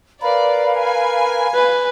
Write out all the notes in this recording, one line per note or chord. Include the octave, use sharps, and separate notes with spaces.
A#4 B4 D5 F5 B5
G#5
B4